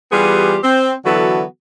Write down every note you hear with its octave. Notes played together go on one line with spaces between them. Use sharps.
E3 G3 B3 F4 G4 G#4
C4
D3 E3 F#3 B3 F#4 A4